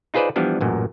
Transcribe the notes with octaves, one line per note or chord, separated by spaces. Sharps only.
D#4 F4 G#4 B4 C5 D5
E3 F3 G3 B3 D4
A1 F#2 A#2